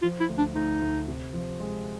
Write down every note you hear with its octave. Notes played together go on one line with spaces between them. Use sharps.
F3 F4
E4
D2
D4
D2 D#4
D2
C3
F3
G#3